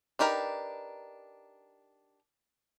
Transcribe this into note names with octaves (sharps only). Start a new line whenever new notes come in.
D4 D#4 G4 A#4 B4